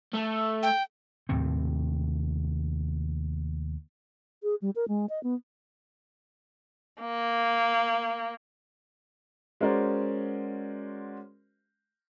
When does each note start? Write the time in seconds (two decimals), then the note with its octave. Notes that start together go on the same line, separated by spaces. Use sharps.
0.14 A3
0.63 G5
1.29 D#2 A2 C3 C4
4.43 G#4
4.62 G3
4.76 A#4
4.88 G#3
5.09 D#5
5.23 B3
7.01 A#3
9.60 G#3 C#4 F#4 A#4 C5 D5